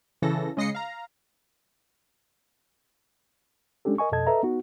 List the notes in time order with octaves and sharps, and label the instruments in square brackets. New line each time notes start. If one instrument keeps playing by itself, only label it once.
[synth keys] C#3 E3 A4 A#6
C#3 G#3 D#5 A#6 C7 C#7
F5 A#5
[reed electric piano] G#3 C#4 D4 G4 A4
A#4 D#5 G#5 C#6
F2 B2 A4 D#5 A5 G#6
A4 B4 D#5 E5 A#5
B3 D#4 F#4